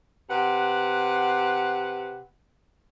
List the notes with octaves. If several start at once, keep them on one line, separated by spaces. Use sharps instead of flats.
C3 B4 F#5